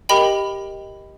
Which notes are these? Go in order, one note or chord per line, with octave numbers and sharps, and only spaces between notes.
G4 A#4 D#5 G5 B5